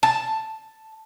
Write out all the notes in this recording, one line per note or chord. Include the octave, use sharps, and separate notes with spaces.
A5